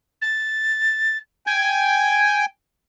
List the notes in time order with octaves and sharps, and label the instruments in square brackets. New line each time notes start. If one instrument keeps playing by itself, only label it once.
[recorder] A6
[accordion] G5 G#5 [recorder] G#6